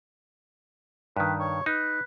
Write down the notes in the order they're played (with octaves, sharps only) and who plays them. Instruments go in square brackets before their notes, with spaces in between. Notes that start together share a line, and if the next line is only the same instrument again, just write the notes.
[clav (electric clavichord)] G2 D#3 [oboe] B4
[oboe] C#5
[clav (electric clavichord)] D#4 [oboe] B4